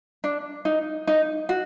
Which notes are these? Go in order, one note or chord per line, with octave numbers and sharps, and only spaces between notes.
D4
D#4
D#4
F#4